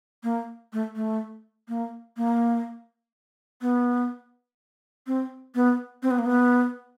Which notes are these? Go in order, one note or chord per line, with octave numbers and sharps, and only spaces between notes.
A#3
A3
A3
A#3
A#3
B3
C4
B3
C4
B3
A#3
B3